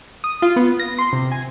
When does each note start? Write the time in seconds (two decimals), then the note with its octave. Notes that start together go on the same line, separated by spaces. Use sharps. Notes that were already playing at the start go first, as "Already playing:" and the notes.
0.24 D#6
0.42 F4
0.56 B3
0.79 A#6
0.98 C6
1.13 C3
1.32 G#5